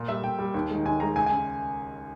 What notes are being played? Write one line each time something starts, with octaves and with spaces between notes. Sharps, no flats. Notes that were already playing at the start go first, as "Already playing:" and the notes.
Already playing: A#2
G3 E5
A#2 G5
G3
D#2
D#3 G#3
D#2 G#5
D#3 G#3 A#5
C#2 G#5
G#5
C#3